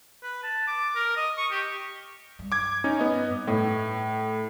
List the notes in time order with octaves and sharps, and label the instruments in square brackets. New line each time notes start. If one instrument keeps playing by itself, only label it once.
[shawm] B4
A5
D6
A#4
D#5
C#6
G4
[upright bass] G2
[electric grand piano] D6 G#6
C#4 D#4
B3 D#5
[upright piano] A2